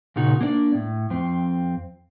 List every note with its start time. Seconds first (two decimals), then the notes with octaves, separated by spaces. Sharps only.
0.16 A#2 C#3 D#4 F#4
0.41 A#3 D4 C#5 D5
0.75 A2
1.10 F2 C4